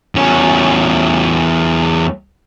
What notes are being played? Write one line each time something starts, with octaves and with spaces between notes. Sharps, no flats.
E2 C#4